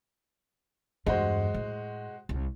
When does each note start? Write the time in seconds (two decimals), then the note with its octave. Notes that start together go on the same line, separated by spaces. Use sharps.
1.06 E2 G2 G#3 F#4 C5
1.54 A2
2.29 C2